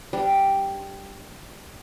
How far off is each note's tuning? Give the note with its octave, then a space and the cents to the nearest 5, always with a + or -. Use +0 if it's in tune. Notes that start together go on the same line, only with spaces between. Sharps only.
G3 +0 D4 +0